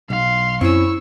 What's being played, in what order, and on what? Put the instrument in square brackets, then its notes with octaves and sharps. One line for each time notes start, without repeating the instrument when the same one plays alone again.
[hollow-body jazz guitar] B1 [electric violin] F5 C6
[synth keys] F#2 [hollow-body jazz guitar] C4 C#4 [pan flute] E4 [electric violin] C#6 E6